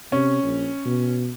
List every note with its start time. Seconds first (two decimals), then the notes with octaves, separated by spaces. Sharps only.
0.12 C3 C#4
0.43 A#1
0.85 B2